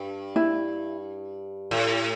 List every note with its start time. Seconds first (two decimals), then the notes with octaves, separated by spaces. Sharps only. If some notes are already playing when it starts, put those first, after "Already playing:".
Already playing: G2
0.36 E4
1.71 A2